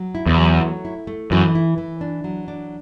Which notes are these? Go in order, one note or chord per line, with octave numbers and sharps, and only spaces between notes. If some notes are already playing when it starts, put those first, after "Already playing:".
Already playing: F#3
E4
E2
F#3
A3
E4
A3
F#2 E3
E4
E3
D4
F#3
D4